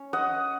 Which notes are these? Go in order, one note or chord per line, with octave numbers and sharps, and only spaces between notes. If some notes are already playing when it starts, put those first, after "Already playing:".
Already playing: C#4 C#5
D#5 F#5